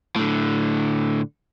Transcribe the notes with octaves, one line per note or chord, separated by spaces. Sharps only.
A2 D3